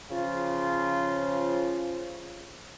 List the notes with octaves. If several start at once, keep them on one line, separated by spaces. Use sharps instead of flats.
C#3 F3 F4